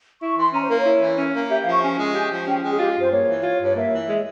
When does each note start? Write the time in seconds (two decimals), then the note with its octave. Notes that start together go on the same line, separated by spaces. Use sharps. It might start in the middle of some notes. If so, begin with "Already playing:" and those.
0.21 E4 C#6
0.37 E3 C6
0.54 C#4 A#5
0.62 C5
0.70 A#3 A#4
0.79 C#5
0.86 E4
1.02 E3
1.18 C#4
1.35 A#3
1.50 G4 E5
1.61 F5
1.66 F3
1.72 C#6
1.83 C#4 G#5
1.99 G#3
2.14 G4
2.31 F3
2.47 C#4 G5
2.63 G#3 G5
2.71 G#4
2.79 F4 G4
2.96 G2 C5
3.12 A#3 C#5
3.28 E3
3.43 F4
3.60 G2 C#5
3.76 A#3 E5
3.92 E3
4.08 G#3